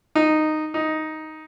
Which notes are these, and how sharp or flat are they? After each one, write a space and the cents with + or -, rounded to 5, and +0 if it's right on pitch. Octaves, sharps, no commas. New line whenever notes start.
D#4 -10
D#4 +5